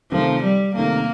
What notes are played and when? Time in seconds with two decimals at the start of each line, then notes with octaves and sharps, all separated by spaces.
0.12 C3 D#3 F3 A3
0.43 G3
0.75 C3 D#3 A3 A#3